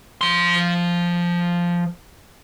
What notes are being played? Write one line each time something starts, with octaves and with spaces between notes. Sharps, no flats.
F3 C6